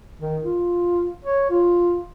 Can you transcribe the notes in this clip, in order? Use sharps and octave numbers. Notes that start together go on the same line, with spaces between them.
D#3
F4
C#5
F4